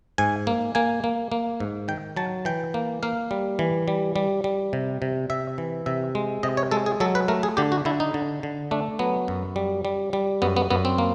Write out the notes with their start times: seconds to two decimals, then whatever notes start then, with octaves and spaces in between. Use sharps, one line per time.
0.18 G#2 G#5
0.47 A#3
0.75 A#3 G#5
1.04 A#3
1.32 A#3
1.60 G#2
1.88 D#3 G5
2.17 F#3 A5
2.45 E3 G5
2.74 A#3
3.03 A#3 F5
3.31 G3
3.59 E3
3.88 G3
4.16 G3
4.44 G3
4.73 C3
5.02 C3
5.30 C3 E5
5.58 E3
5.86 C3 E5
6.15 G#3
6.43 C3 D#5
6.57 C#5
6.71 G#3 A4
6.86 G#4
7.00 F#3 A4
7.15 B4
7.28 A3 A#4
7.43 G#4
7.57 D3 G4
7.72 F#4
7.85 D3 E4
8.00 D#4
8.14 D3
8.43 D3
8.71 A3 D4
8.99 F#3 B3
9.28 F#2
9.56 G3
9.85 G3
10.13 G3
10.42 F#2 B3
10.56 B3
10.70 F#2 B3
10.85 C4
10.98 A#3